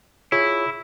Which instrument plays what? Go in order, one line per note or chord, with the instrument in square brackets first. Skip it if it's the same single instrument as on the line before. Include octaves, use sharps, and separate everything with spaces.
[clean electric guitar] E4 [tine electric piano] F4 G#4 C#5